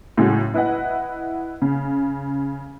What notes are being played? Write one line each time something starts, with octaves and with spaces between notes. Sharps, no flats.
A2 C#3 F#3 G#3 F#4
E4 B4 D#5 F#5
C#3